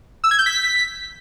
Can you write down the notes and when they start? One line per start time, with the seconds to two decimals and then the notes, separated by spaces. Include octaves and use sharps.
0.24 E6
0.31 G#6
0.39 G6
0.46 B6